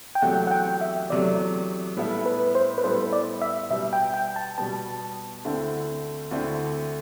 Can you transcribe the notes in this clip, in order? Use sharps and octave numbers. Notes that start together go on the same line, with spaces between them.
G5
E2 C3 F#3 A3 F#5
F#5
G5
E5
E2 C3 F#3 A3 D5
A2 G3 B3 E4 A4
B4
C5
B4
A2 G3 B3 E4 A4 C5
D5
E5
B2 G3 B3 E5
G5
G5
A5
B2 G3 B3 A5
D2 D3 A3 C4 E4
D2 D3 A3 C4 E4